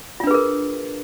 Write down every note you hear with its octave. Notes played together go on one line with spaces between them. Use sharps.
D4 F4 G#4 A#4 B4